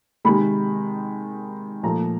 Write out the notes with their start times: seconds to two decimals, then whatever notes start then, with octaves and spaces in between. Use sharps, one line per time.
0.25 C3 D#3 G#3 B5
1.83 A#2 F3 A3 A#5